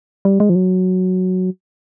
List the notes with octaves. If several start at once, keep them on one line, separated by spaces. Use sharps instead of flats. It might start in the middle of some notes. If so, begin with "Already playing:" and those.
G3
G#3
F3
F#3